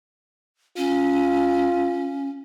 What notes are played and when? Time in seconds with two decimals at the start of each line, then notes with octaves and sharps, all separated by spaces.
0.77 C#4 F4